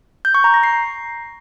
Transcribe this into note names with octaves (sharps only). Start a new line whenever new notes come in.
G6
C#6
A#5
A#6
C7